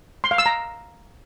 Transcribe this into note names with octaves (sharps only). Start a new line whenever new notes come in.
C6
F5
E6
A#5